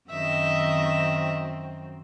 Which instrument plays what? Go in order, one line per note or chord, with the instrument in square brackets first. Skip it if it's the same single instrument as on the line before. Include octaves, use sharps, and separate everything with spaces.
[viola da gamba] F#2 D#3 C4 [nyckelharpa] D#5 E5